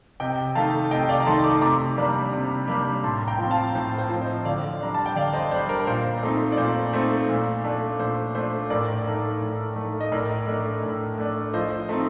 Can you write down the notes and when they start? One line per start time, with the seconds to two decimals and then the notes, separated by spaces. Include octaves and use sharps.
0.20 C3 D#5 G5
0.55 D#3 A3 D#4 F5 A5
0.91 C3 D#5 G5
1.09 D5 F5
1.20 A#5
1.26 D#3 A3 D#4 A5 C6
1.44 A#5 D6
1.62 C3 A#5 D6
1.97 G3 A#3 D4
2.33 C3
2.68 G3 A#3 D4
3.03 A2 A5 C6
3.28 G5 A#5
3.39 F3 C4
3.51 F5 A5
3.75 A2 C5
3.98 C5
4.09 F3 C4
4.22 C5 D#5
4.45 D3 D5 F5
4.80 G3 D4 A#5
4.94 A5
5.06 G5
5.15 D3 D5 F5
5.33 C5 D#5
5.51 G3 D4 C5
5.69 A#4
5.87 A#2 C5
6.23 A3 C4 D#4
6.52 D5
6.58 A#2 C5
6.93 A3 C4 D#4 C5
7.29 A#2
7.64 A3 D4
7.99 A#2 C5
8.35 A3 D4 C5
8.70 A2 A#4 D5
9.06 A3 D#4
9.41 A2
9.76 A3 D#4
10.01 D#5
10.12 A2 A#4 D5
10.47 A3 D4
10.83 A2
11.18 A3 D4
11.53 F3 C5 D#5
11.89 A3 C4 D#4